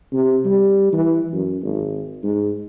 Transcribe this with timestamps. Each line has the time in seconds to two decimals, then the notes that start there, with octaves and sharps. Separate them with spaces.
0.13 C3
0.45 G3
0.93 E3
1.33 F#2
1.62 G#1
2.23 G#2